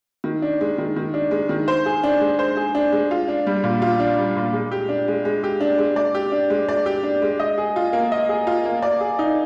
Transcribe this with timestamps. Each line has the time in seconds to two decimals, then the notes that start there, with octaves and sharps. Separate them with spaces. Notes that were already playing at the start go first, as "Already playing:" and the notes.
0.24 D#3
0.42 D4
0.61 G#3
0.78 D#3
0.96 D#3
1.14 D4
1.31 G#3
1.49 D#3
1.68 C5
1.86 G#4
2.03 D4
2.21 G#3
2.39 C5
2.57 G#4
2.75 D4
2.92 G#3
3.11 F4
3.28 D4
3.47 G3
3.64 A#2
3.82 F4
4.00 D4
4.18 G3
4.36 A#2
4.53 G#3
4.72 G4
4.89 D4
5.08 G#3
5.25 G#3
5.44 G4
5.61 D4
5.78 G#3
5.96 D5
6.15 G4
6.32 D4
6.50 G#3
6.69 D5
6.86 G4
7.03 D4
7.22 G#3
7.40 D#5
7.58 G#4
7.76 F4
7.93 A#3
8.12 D#5
8.29 G#4
8.47 F4
8.65 A#3
8.82 D5
9.01 G#4
9.19 D#4